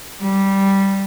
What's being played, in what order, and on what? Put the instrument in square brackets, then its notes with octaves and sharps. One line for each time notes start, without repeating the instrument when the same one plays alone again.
[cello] G3